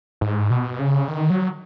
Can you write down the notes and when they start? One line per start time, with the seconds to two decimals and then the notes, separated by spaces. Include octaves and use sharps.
0.21 G#2
0.50 B2
0.79 C#3
1.08 D#3
1.30 F#3